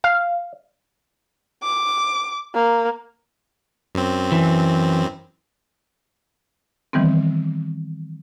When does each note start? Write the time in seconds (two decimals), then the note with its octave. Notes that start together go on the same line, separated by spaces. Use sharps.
0.04 F5
1.63 D6
2.55 A#3
3.95 F#2 C4
4.32 E3
6.93 D#3 E3 G3 B3 C4